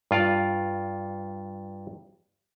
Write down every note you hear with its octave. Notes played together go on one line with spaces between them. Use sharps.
G2 F4 D5 F5